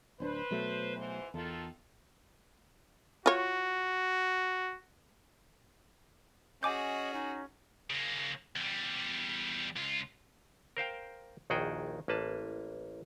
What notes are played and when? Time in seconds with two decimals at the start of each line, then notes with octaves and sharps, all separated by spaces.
0.20 D1 C#4 D4 B4 C5
0.51 B2 F#3 A3
0.96 G#2 E3 C5
1.34 E2 D#3 F4 A4
3.26 F4 F#4 C#5
6.63 C#4 F#4 G#4 D#5 G#5 D6 G6
7.14 D#4
7.90 C#3 A#3
8.56 E2 G3
9.76 C#2 F4
10.77 A#4 C5 F5 G5
11.50 A#1 D#2 D#3 F#4 G#4 G5
12.08 A1 A#3 B4 A5